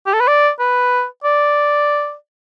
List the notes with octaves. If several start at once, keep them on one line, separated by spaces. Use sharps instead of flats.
G4
A4
B4
D5
B4
D5